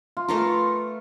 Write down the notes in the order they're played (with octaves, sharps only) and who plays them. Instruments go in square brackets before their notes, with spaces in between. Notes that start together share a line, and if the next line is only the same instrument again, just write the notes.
[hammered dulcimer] F4
[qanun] A3 F4 A#4 [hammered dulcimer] B4
[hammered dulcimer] C#6